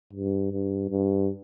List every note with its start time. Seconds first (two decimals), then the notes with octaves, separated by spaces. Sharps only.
0.13 G2
0.51 G2
0.90 G2